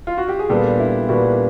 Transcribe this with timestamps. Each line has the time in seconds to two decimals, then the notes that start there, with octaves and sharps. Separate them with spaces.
0.07 F4
0.18 F#4
0.28 G4
0.39 G#4
0.49 A#2 G3 B3 D4 G4 A4
0.79 E4
1.09 A#2 G3 B3 D4 E4 F#4